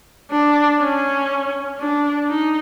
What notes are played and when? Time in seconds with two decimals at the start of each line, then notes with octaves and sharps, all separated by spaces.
0.31 D4
0.80 C#4
1.79 D4
2.29 D#4